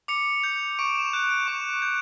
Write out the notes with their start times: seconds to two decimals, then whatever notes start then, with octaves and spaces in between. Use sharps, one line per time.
0.08 D6 C#7
0.44 G6
0.79 C#6 D7
0.95 E7
1.13 F#6 D7
1.30 D7
1.48 C#6 E7
1.82 G6